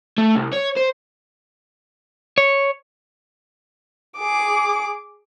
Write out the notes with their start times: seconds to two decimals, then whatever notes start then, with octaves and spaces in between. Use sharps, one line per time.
0.18 A3
0.36 C2
0.53 C#5
0.77 C5
2.38 C#5
4.18 G#4 D6